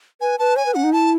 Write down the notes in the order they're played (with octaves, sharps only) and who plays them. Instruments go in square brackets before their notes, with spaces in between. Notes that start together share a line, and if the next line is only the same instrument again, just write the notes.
[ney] B4 [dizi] G#5
[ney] B4 [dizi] A5
[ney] C#5 [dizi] G#5
[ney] B4
[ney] C#4 [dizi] F#5
[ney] D#4
[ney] E4 [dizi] A5